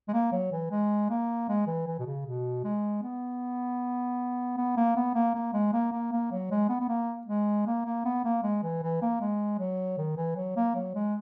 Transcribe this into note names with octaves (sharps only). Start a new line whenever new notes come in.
G#3
A#3
F#3
E3
G#3
A#3
G#3
E3
E3
B2
C#3
B2
G#3
B3
B3
A#3
B3
A#3
A#3
G#3
A#3
A#3
A#3
F#3
G#3
B3
B3
A#3
G#3
A#3
A#3
B3
A#3
G#3
E3
E3
A#3
G#3
F#3
D#3
E3
F#3
A#3
F#3
G#3